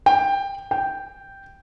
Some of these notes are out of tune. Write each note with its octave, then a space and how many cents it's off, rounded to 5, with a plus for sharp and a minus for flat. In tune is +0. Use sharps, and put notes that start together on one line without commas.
G5 +10
G5 -5